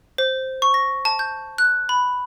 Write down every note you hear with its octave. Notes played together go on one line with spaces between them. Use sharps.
C5
C#6
A#6
A5
G6
F#6
B5